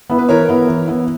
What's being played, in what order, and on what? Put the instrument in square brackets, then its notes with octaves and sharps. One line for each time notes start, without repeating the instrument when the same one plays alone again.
[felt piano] B3 E4
[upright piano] B4
[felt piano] E3 [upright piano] A#4 C#5
[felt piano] B3 E4
E3
B3 E4